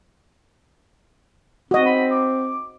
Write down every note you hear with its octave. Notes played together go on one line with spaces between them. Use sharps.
C4 F#4 D#5
B5
D6